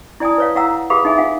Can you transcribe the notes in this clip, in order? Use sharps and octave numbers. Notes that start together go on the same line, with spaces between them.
E4 D5 G#5 A5 D#6
B4 C#5 F5
E4 F5 F#5 A#5 E6
G4 G#4 B4 F5 B5 D#6
D#4 G#4 E5 G#5
F4 F5 F#5 G#5